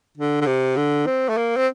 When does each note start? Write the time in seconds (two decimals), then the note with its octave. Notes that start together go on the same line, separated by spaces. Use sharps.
0.17 D3
0.41 D3
0.47 C3
0.77 D3
1.06 C4
1.29 A3
1.37 A#3
1.56 C4